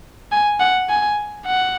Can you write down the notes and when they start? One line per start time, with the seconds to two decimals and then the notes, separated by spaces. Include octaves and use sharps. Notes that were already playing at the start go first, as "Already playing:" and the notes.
0.32 G#5
0.60 F#5
0.89 G#5
1.46 F#5